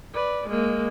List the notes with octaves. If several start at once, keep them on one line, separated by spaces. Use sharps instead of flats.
B4 D5
G#3 A#3